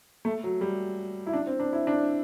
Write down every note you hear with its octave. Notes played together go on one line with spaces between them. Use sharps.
A3
F#3
G3
E4
D4
C4
D4
E4
D4